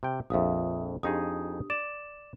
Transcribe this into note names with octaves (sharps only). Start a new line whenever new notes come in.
C3 G5
A#1 F2 E5 F5 D#6
F2 D4 D#4 G4 G#4 D#6
D5 E7